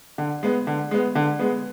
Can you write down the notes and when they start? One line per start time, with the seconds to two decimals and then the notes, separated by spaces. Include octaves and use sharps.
0.18 D3
0.43 G#3 B3
0.67 D3
0.91 G#3 B3
1.15 D3
1.39 G#3 B3